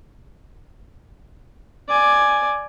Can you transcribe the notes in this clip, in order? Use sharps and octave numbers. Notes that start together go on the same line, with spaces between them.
D5 G#5